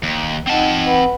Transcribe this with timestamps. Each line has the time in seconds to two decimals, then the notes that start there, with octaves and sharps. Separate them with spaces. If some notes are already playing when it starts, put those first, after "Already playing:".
0.03 D#2
0.47 C4 D#4 D#5 F#5 A5
0.86 B4 F#5 B5